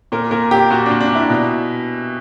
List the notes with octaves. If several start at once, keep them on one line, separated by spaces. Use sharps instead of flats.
A#2 A#4
A#2 A#4
A#2 G4
A#2 F#4
A#2 D4
D4
A#2 E4
B2